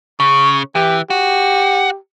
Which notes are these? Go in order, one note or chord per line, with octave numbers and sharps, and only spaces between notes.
C#3 C#6
E3 G4
F#4 G4